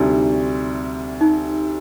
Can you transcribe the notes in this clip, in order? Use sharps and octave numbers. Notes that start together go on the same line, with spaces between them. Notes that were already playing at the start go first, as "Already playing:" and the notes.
Already playing: D2 C3 G3 D#4
D#4